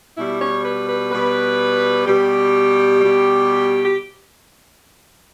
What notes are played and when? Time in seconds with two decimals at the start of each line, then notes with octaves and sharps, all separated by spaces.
0.17 B2 G3 E4
0.41 C#5
0.64 B4
0.88 B4
1.11 B2 G3 B4
2.05 B2 G3 G4
3.00 B2 G3
3.84 G4